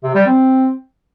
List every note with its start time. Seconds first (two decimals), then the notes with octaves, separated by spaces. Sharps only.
0.04 C3
0.15 G3
0.26 C4